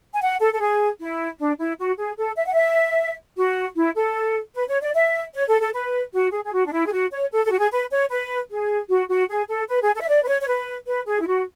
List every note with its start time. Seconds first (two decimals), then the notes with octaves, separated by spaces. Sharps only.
0.14 G#5
0.21 F#5
0.40 A4
0.53 A4
0.60 G#4
1.00 E4
1.39 D4
1.59 E4
1.78 F#4
1.98 G#4
2.18 A4
2.38 E5
2.46 F#5
2.53 E5
3.37 F#4
3.76 E4
3.96 A4
4.55 B4
4.69 C#5
4.81 D5
4.94 E5
5.34 C#5
5.48 A4
5.61 A4
5.73 B4
6.13 F#4
6.32 G#4
6.44 G#4
6.53 F#4
6.66 D4
6.72 E4
6.86 G#4
6.92 F#4
7.11 C#5
7.32 A4
7.45 A4
7.51 F#4
7.58 G#4
7.71 B4
7.91 C#5
8.10 B4
8.50 G#4
8.89 F#4
9.09 F#4
9.29 G#4
9.49 A4
9.68 B4
9.81 G#4
9.95 A4
10.01 E5
10.08 D5
10.24 B4
10.28 C#5
10.41 C#5
10.47 B4
10.86 B4
11.07 G#4
11.20 E4
11.27 F#4